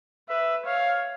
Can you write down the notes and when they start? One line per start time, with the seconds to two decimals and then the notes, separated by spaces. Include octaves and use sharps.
0.29 B4 E5
0.66 C#5 F5